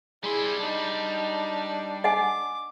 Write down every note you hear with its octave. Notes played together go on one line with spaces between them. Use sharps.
G3 E4 G#4 C6
D4 D#4
D#5 F#5 G#5 D6